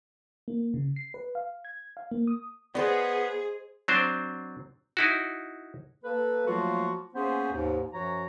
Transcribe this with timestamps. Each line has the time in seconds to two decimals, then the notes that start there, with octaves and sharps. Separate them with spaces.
0.48 A#3
0.74 C#3
0.96 C7
1.14 B4
1.35 F5
1.65 G#6
1.97 F5
2.11 A#3
2.27 D#6
2.75 B3 G#4 C5 D5 D#5
3.88 F#3 C4 D4 C5
4.97 D#4 E4 F#4
6.04 A#3 A4 B4
6.46 F3 F#3 A3 A#3 F4 F#4
7.15 A#3 B3 C#4 G#4 C5
7.52 D#2 G#2
7.93 F#2 F3 F#4 C#5 A#5